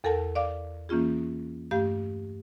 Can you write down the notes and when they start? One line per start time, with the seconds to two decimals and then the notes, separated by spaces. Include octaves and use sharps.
0.04 E2 A4 A#4 F#5 A5
0.35 D5 F5 D6
0.89 E3 A#3 C#4 F4 G#4
1.71 G2 A3 G4 F5 G6